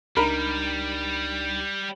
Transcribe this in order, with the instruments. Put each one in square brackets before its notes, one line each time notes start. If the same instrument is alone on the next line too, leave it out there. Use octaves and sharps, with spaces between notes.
[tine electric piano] C#2 D4 D#4 [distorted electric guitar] G3 [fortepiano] A#4 B5